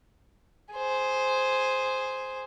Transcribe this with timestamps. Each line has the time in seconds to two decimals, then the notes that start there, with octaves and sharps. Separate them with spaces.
0.73 G#4 C5